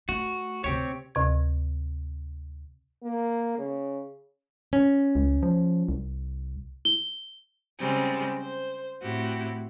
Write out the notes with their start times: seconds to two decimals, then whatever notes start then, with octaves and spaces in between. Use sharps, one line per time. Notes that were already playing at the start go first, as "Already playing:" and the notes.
0.09 A3 F#4
0.64 D2 C3 C4 G4 C#5
1.15 D2 C3 G#6
3.03 A#3
3.58 C#3
4.73 C#4
5.15 C#2
5.43 F3
5.89 C2
6.85 G7
7.79 C#3 G3 G#3 C4
8.41 C5
9.02 A2 C4 E4 F#4 G4